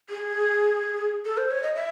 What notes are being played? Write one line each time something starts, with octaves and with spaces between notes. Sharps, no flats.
G#4
A4
C5
C#5
D#5
E5